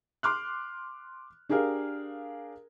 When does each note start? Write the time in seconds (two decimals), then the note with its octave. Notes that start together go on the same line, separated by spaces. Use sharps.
0.23 C6 D6 F6 F#6
1.49 D4 G4 G#4 A#4 F5